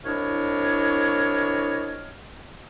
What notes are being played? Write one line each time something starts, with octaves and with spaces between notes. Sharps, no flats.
C2 D4 E4 C#5 D#5 F6